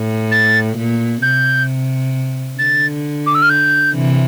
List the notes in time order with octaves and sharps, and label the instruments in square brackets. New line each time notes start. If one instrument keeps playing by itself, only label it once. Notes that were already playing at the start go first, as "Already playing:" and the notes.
Already playing: [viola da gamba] A2
[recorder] A6
[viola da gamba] A#2
[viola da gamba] C3 [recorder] G6
[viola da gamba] D3 [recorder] A6
[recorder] D6
E6
F6
G6
[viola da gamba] C3 E3